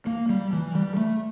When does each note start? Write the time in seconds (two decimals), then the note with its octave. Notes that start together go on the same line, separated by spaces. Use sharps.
0.07 A#3
0.29 G3
0.53 E3
0.75 G3
0.97 A3